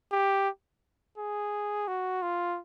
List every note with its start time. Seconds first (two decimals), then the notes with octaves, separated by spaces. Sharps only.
0.12 G4
1.18 G#4
1.88 F#4
2.22 F4